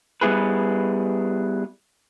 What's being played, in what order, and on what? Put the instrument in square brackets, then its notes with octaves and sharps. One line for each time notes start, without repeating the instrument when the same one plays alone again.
[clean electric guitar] G3 B3 E4 G#4 B4